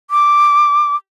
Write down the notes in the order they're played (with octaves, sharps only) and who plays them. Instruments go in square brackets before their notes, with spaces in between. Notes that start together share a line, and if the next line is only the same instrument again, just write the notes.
[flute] D6